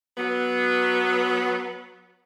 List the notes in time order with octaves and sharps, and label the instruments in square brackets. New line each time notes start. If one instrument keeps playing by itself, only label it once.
[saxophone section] F#3 B3